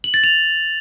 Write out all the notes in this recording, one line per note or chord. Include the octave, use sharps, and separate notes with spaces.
F#7
A6
F7